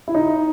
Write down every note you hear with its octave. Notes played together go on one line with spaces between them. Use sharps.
E4
D#4